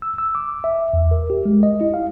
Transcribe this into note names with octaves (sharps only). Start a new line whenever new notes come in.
E6
E6
D6
E5
E2
A#4
G4
G#3
D#5
E4
F5